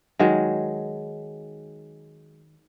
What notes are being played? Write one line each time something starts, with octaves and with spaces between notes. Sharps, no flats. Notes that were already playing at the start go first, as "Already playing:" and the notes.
D#3 F#3 G#3